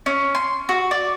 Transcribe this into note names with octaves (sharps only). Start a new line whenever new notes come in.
C#4
C6
F#4
D5